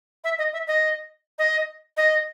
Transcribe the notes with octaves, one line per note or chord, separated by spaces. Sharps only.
E5
D#5
E5
D#5
D#5
D#5